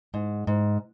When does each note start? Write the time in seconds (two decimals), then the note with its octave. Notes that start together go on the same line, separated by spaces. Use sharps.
0.14 G#2
0.47 G#2